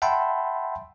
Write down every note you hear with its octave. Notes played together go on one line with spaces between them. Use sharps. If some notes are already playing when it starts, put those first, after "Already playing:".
E5 F#5 G5 A5 B5 C6